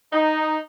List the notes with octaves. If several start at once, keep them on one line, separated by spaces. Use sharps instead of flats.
D#4